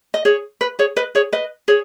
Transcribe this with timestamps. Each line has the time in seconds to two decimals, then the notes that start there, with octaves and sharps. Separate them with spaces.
0.14 D#5
0.25 G#4 C#5
0.61 B4
0.79 G#4 C#5
0.96 B4 D#5
1.15 G#4 C#5
1.32 B4 D#5
1.68 G#4 C#5